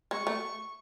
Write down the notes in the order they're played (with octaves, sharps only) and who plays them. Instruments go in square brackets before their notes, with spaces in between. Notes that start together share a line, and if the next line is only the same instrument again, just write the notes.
[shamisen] G#3 [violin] C#6
[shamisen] A3